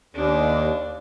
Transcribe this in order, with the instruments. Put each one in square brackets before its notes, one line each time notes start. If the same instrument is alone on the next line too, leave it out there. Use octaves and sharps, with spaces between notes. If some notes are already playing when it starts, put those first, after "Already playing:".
[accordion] D#2 [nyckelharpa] D4